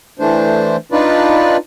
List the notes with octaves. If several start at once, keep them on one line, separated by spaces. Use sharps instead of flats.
E3 A3 D4 C5
D4 D#4 F4 B4 D5